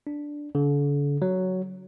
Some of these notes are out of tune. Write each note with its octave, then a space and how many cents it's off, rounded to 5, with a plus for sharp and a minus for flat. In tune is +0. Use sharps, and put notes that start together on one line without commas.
D4 +0
D3 -40
F#3 +5